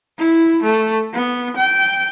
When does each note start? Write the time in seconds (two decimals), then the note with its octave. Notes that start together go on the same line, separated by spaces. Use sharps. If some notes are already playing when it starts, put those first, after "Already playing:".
0.18 E4
0.63 A3
1.14 B3
1.57 G5